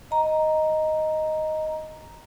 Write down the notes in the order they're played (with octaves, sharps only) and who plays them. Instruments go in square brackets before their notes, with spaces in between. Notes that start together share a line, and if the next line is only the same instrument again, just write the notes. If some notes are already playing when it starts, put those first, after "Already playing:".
[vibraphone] D#5 A#5